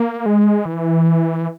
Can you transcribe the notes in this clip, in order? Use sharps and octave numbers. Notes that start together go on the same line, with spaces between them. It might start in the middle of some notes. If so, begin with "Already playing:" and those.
Already playing: A#3
G#3
E3